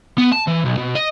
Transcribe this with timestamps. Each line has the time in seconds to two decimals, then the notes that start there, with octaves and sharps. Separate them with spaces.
0.18 B3
0.32 A5
0.47 E3
0.65 B1
0.77 B2
0.95 D#5